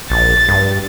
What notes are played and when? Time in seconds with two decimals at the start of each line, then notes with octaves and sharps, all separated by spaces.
0.10 A#1 A6
0.49 G2